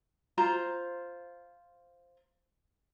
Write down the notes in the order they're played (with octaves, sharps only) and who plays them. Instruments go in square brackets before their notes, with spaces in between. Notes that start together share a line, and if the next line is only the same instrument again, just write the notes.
[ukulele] F4 C5 A#5